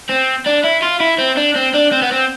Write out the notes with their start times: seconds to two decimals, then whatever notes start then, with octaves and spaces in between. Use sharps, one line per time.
0.09 C4
0.46 D4
0.64 E4
0.82 F4
1.00 E4
1.18 C4
1.37 D4
1.56 C4
1.74 D4
1.92 C4
2.02 B3
2.11 C4